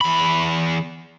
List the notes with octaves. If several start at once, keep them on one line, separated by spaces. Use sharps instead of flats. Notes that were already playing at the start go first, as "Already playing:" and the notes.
E2 B5